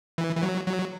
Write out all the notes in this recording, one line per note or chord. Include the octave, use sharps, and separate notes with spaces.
E3
E3
F#3
F#3